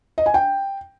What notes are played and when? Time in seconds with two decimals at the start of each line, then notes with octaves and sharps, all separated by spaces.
0.18 D#5
0.26 G#5
0.34 G5